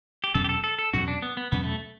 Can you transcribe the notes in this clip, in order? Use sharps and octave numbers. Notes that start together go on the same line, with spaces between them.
G4
E2 B2 F#3 C#4 A4
G4
A4
A4
A4
E2 B2 F#3 C#4 F#4
D4
B3
B3
E2 B2 F#3 B3 C#4
A3